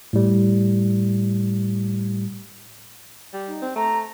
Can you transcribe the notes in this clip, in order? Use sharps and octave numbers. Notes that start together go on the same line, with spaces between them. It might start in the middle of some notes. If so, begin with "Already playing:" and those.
A2 G3
G3
D#4
C4
A3 A#5